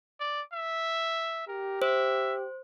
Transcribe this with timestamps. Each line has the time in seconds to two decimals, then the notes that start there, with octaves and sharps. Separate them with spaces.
0.20 D5
0.53 E5
1.48 G4 A#4
1.82 C5 E5